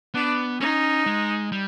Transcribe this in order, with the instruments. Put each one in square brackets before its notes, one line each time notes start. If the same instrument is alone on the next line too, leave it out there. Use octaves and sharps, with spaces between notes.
[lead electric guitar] B3 [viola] D4
[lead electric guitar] C#4 [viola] D#4
[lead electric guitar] G#3
G3